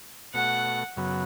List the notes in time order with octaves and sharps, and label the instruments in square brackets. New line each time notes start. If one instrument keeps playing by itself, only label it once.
[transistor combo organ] B2 A3 F#4 [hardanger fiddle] F#5
[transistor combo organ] F#2 C#3 F#3 B3